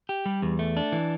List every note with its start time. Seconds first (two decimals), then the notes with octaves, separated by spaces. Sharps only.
0.09 G4
0.26 G3
0.42 E2
0.59 A3
0.77 D4
0.92 E3